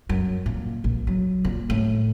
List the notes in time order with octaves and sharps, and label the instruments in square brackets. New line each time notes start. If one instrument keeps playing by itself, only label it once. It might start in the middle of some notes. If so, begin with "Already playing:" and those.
[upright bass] F#2
A#2
A#1
F#3
A#2
A2